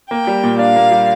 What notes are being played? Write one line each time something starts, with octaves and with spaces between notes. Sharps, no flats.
A#3 G5
G3
A#2
D4 F5
A#3
G3